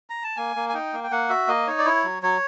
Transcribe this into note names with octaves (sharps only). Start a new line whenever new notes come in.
A#5
A5
A#3 G#5
A#3
G#5
D#4 G5
A#3
G5
A#3 F#5
F#4 E5
A#3 D#5
D#4 C#5
D5
E4 C#5
F#3
F#3 C#5